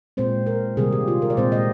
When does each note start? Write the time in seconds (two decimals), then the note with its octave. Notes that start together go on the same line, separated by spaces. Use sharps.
0.17 A#2 G#3 C4 C5
0.46 A#4
0.77 C3 D#3 G3 A#3 G#4
0.93 G4
1.08 F4
1.22 A#4
1.30 D5
1.37 A#2 G#3 C4 C5
1.52 D#5